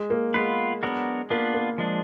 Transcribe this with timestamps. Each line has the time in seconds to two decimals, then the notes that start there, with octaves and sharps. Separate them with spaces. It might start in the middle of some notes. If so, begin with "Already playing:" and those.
Already playing: G#3
0.10 A#3
0.34 G#3 B3 F4 B4
0.83 F#3 B3 D4 F#4 A#4
1.30 A#3 B3 D4 F4 B4
1.54 A#3
1.78 F3 G#3 D4